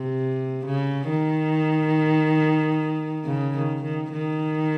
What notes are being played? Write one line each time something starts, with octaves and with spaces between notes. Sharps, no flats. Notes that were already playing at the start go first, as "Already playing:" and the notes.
Already playing: C3
C#3
D#3
C#3
D#3
D#3
D#3